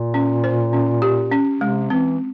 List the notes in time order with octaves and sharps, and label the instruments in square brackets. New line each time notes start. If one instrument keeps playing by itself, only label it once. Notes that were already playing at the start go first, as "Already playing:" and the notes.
Already playing: [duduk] A#2
[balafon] C#4
C5
C#4
G4
C#4
[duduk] C3 [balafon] G#3
[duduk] E3 [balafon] C4